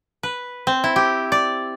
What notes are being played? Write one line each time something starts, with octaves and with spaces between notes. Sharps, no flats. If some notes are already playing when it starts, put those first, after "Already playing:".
B4
C4
E4
G4
D5